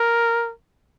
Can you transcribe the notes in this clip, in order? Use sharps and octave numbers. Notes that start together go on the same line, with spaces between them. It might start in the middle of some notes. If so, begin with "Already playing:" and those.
Already playing: A#4